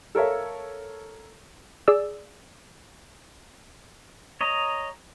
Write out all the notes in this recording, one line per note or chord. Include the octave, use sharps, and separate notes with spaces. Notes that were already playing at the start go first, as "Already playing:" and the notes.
A4 A#4 C#5 E5 F5
G#4 D5 E6
C#5 D#5 A#5